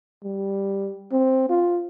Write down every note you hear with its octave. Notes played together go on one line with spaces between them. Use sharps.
G3
C4
F4